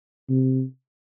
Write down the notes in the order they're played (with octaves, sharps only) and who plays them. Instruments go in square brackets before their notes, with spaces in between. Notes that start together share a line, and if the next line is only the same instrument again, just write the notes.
[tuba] C3